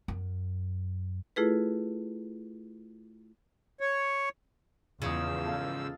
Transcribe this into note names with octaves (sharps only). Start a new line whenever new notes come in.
F#2
A3 E4 F4 G#4 A4 B4
C#5
E2 G#2 C#3 F3 F4 D#5 E6
A4 F5